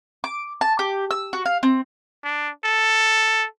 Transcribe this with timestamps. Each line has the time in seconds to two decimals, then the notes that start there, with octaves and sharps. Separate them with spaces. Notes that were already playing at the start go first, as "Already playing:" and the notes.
0.24 D6
0.61 A5
0.79 G4
1.11 E6
1.33 F#4
1.45 F5
1.63 C4
2.24 D4
2.64 A4